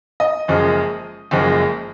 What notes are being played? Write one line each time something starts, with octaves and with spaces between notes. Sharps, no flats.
D#5
F#1 F#2 F3 G#3
F#1 F#2 F3 G#3